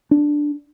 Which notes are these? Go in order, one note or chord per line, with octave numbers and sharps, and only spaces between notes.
D4